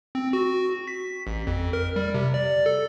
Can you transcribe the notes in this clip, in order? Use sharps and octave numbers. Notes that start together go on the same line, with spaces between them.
C4
F#4
B6
A1
F2
A#4
G3
C3
D5
A4